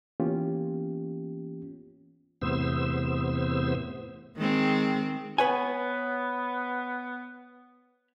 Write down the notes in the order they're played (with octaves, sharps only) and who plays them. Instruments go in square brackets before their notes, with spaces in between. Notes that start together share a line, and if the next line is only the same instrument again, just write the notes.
[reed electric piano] E3 A#3 B3 C#4 F4 G4
[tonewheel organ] E2 A2 C3 B3 C5 E6
[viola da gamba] D#3 G#3 C4
[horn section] B3 [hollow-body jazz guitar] B4 C#5 G#5